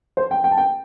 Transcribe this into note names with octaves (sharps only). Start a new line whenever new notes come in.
C5
G5
G5
A5
G5